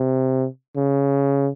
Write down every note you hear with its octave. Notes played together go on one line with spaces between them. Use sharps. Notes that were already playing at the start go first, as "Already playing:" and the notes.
Already playing: C3
C#3